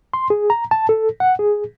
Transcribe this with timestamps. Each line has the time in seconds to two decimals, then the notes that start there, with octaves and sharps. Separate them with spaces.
0.14 C6
0.30 G#4
0.50 A#5
0.71 A5
0.89 A4
1.20 F#5
1.39 G#4